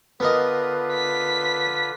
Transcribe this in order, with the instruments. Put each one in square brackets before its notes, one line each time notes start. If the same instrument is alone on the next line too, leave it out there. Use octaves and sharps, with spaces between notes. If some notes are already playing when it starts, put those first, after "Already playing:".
[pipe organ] D3 F4 B4 [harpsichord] B3 A#4 D#5
[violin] B6